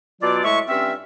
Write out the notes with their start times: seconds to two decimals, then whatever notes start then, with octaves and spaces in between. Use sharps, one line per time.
0.22 B2 F#3 F4 D5
0.44 A2 G#3 E5 C#6
0.68 G2 C4 C#4 F4 E5